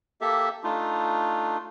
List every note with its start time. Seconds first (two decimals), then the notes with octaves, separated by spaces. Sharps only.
0.21 A#3 G4 A4 E5
0.64 A3 D4 D#4 F4